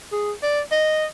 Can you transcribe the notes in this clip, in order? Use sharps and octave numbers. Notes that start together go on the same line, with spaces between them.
G#4
D5
D#5